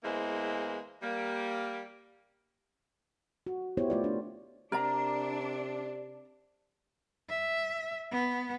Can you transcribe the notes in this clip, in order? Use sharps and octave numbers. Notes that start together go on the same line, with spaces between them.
E2 E3 G#3 A#3 C5
G3 A#3
F#4
B3 E4 G4 C5 C#5
A3 F4 D5
D4
C3 D4 A#4 D5 A#5
E5
B3